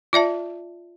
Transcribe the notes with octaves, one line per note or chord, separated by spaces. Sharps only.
F4 D5 E5 A5